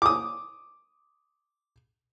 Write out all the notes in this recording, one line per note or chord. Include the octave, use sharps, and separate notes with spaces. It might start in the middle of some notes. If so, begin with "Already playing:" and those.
D6 D#6